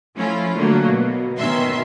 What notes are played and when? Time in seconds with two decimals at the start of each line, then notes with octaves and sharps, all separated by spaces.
0.15 F3 A3 C#4 E4 F4
0.56 D3 F#3 A3 A#3
0.87 B2
1.38 B2 D#3 C#4 E5 C6